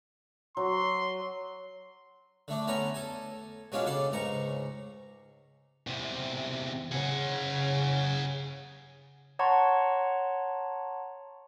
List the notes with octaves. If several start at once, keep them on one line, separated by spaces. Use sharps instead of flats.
F#3 C6
D3 A3 D4
A3 B3 C#4 A#5
A4 G#5
B2 G#3 C#4 D4 F4
C#3 A4 D5 C6
C#2 G#2 A#5 C#6
E2 C3
C#3 G#4 F#5
C#5 F#5 A5 A#5 C6 C#6